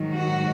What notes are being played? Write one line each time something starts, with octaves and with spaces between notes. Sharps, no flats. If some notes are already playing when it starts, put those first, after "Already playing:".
Already playing: G#2 D#3 F#3
F#4